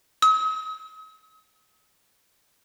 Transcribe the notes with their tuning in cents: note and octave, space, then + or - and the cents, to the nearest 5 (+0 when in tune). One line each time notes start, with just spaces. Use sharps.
D#6 +45